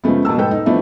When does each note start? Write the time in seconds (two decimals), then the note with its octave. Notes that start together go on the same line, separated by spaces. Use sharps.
0.04 C#3 F3 G#3 A3 B3
0.25 B2 A#3 A5 E6
0.38 G#2 A4 B4 G5
0.51 D#4
0.66 F3 A3 B3 D4 E4